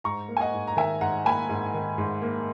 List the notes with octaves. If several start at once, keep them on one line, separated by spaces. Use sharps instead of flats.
G#2 A#5 C#6
A#3
G#5
D#5 F#5
G#2
A#5
D#3 E5 G#5
G#2 F#5 A#5
A#3 G#5 B5
G#2
D#3
G#2
A#3